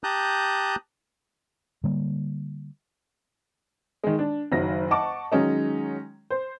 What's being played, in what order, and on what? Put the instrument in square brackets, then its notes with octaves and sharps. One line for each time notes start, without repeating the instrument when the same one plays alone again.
[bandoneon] G4 A5 A#5 D#6 F#6 G6
[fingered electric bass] D3 G3 A#3
[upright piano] D#3 G#3
D4
F#1 D#3 F#3 A#6
D#5 F#5 A5 C#6 D6
D#3 F#3 G#3 C#4 D#4
C5